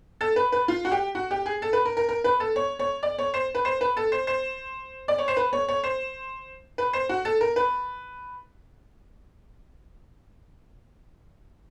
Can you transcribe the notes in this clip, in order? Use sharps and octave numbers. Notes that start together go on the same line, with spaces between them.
A4
B4
B4
F4
F#4
G4
F#4
G4
G#4
A4
B4
A#4
A#4
A#4
B4
A4
C#5
C#5
D5
C#5
C5
B4
C5
B4
A4
C5
C5
D5
C#5
C5
B4
C#5
C#5
C5
B4
C5
F#4
A4
A#4
B4